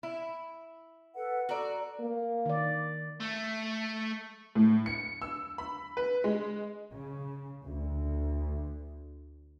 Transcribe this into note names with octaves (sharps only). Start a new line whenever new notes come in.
E4
A4 B4 F#5
F#4 A4 D5 A#5
A#3
D#3 D5
A3
A2
C#7
E6
B5
B4
G#3
C#3
D2